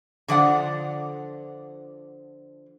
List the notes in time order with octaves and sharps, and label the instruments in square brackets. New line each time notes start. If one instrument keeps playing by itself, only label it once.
[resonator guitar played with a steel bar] D3 F3 D5 F#5